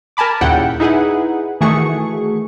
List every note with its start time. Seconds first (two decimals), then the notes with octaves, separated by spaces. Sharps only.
0.17 A#4 G#5 A5 B5 D6
0.41 D#2 A#2 C#3 E4 F#5 G5
0.80 D#4 E4 G#4 B4 F#5
1.61 D#3 E3 A3 F#4 G#4 C#6